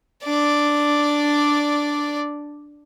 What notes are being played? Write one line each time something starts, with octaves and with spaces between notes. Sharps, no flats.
D4 D5